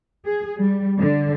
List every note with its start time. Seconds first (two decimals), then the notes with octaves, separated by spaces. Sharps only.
0.25 G#4
0.58 G3
0.99 D3